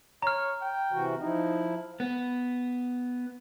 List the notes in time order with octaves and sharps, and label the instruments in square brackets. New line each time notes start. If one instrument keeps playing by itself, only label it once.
[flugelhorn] C#5 [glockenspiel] A#5 F6
[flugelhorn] G5
[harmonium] C3 E3 F#4
[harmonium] F3 E4 [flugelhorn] D#4
[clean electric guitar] B3